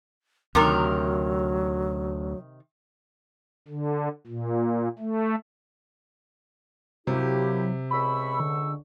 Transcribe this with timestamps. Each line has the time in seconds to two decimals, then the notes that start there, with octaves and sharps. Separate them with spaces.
0.55 D2 C3 D#3 F#3 A#4
3.68 D3
4.27 A#2
4.99 A3
7.07 C3 F#3 A#3 E4 G4
7.91 C#2 B5 C#6 E6
8.40 D3